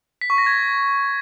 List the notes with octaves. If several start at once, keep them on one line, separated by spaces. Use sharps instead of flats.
B6
C#6
A#6
G#6